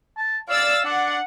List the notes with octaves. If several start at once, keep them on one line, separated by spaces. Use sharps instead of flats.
A5
D5 F5 E6 A6
D4 F#5